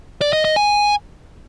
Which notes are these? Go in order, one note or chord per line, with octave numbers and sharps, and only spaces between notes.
D5
D#5
D#5
G#5